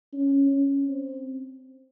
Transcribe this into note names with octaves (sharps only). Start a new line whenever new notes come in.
C#4
C#4
C4